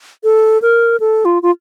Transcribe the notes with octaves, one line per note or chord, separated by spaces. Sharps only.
A4
A#4
A4
F4
F4